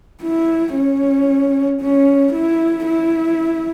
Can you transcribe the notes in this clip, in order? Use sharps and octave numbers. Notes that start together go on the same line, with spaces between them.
E4
C#4
C#4
E4
E4